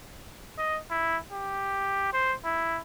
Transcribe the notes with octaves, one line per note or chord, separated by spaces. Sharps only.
D#5
E4
G4
C5
E4